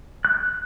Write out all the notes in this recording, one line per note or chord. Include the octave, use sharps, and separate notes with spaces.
F#6